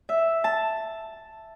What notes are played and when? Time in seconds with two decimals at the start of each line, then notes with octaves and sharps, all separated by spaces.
0.09 E5
0.44 A5